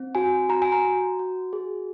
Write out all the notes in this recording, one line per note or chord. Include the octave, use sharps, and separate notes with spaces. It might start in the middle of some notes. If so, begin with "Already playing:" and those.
Already playing: C4
F#4 G#5
F#4 A#5
G#5
A#5
F#4
F#4
G#4